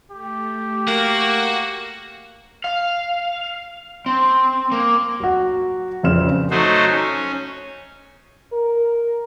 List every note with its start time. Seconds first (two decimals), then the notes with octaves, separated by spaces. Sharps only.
0.11 A3 G4
0.88 A#3 F#4
2.64 F5
4.06 C4
4.72 A#3
5.20 F#3 F#4
6.03 F1 A#1 C#3 C4 F6 E7
6.51 F#3 A3 D#4 F#4 C5
6.90 C#4
8.53 A#4